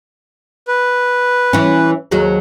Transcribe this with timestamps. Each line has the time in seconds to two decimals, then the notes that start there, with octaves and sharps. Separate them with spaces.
0.68 B4
1.53 E3 C#4
2.11 D#2 F#3 G#3